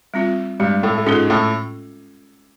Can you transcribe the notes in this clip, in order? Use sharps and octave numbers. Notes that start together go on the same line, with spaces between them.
G3 C4 F4
G2 G3 G#3
A2 A3
A3
G#2 G#3 C#4 F4 A4
A2 A3